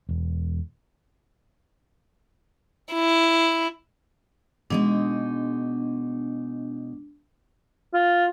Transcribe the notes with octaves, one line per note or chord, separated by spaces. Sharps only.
E1
E4
B2 G#3 D4 D#4
F4